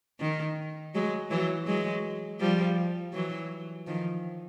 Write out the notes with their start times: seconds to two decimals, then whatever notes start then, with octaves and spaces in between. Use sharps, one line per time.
0.20 D#3
0.95 F#3 G#3
1.31 E3 F#3
1.67 F#3 G#3
2.40 F3 G3
3.13 E3 F#3
3.87 D#3 F3